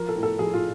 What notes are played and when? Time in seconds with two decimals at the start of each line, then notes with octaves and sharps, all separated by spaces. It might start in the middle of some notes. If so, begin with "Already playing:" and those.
Already playing: F3 A#4
0.09 A4
0.16 A2
0.23 A4
0.39 F3 G#4
0.54 F4